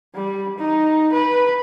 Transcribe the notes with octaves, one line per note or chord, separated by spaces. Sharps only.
G3
D#4
B4